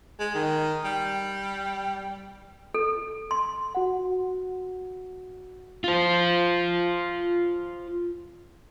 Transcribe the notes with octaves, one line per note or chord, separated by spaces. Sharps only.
G#3
D#3
G3
A4
C6
F#4 F#5
F4 C5